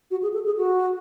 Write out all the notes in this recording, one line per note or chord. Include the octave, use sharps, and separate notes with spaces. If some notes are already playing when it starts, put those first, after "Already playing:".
F#4
G#4
A4
G#4
F#4